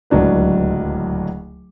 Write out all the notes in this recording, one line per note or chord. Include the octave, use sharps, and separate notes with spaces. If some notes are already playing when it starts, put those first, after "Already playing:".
D1 C#2 F#3 D4 B4